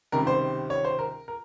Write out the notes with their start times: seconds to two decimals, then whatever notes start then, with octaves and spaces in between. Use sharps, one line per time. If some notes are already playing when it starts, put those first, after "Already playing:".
0.12 C#2 C3 D#3 G3 A#4
0.27 C5
0.70 C#5
0.85 C5
0.99 A#4
1.28 A#4